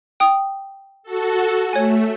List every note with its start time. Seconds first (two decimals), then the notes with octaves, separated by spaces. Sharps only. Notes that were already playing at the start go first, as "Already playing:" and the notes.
0.20 G5 D#6
1.03 F#4 A4
1.73 A3 C#5 G#5